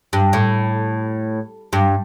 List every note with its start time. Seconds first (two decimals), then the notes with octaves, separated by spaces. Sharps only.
0.13 G2
0.33 A2
1.73 G2